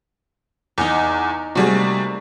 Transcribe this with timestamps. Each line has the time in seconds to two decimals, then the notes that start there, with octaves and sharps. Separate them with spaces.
0.78 E2 D#4 F5 C#6
1.55 C3 G3 A3 A#3 F#4 G#4